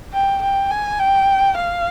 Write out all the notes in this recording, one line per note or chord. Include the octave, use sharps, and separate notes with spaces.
G5
G5
G#5
G5
F5